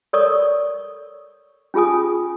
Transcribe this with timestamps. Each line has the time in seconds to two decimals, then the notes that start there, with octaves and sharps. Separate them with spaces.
0.13 A4 A#4 C#5 D5 C#6 D#6
1.74 C#4 F4 G#4 G#5 D#6